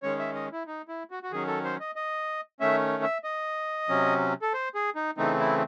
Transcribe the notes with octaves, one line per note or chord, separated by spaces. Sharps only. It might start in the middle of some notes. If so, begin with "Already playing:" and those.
D#3 G#3 C#4 C#5
E5
D#5
E4
D#4
E4
F#4
F#4
D#3 F#3 C#4 G#4
A4
C5
D#5
D#5
D#3 A3 C#4 E5
E5
D#5
C3 F#3 C#4
A4
C5
G#4
D#4
C#3 E3 A3 C4 D#4
E4